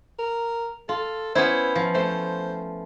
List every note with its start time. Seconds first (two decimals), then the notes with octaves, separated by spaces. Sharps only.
0.19 A#4
0.89 F4 A4
1.35 B3 C#4 E4 C5
1.76 F3
1.95 A3 C5